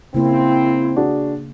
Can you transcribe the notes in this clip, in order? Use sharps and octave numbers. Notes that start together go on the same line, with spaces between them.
C#3 A#3 C4 E4
D4 F#4 G#4